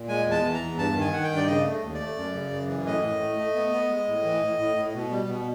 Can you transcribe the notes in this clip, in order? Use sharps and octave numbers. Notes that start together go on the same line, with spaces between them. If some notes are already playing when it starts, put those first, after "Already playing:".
Already playing: A#2
G#3 G#5
E2
A5
E3
A#5
E2
G2 A5
D#3
G#5
D#3 F#5
G5
G2
D5
C#3 D#5
A3
D#2
D5
A3
F#2
C#3
F#2
E3
A2 D#5
A2
A3
A3
B3
B3
G#3
A2
E3
A2
A2
A2
B2
G3
B2